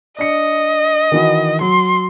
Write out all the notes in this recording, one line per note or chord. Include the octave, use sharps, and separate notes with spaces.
D4 D#5 C#7
D#3 E3 F#4
F#3 C6